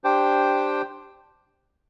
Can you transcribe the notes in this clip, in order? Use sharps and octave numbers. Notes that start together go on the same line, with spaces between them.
D4 G4 C5 G5